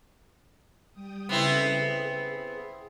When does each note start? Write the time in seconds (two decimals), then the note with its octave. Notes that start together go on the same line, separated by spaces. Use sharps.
0.92 G3 G5 D#6
1.29 C#3 B3 C4 E4 A4 D#5
1.61 G#4